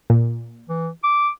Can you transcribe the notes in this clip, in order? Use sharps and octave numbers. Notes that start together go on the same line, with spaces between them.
A#2
E3
D6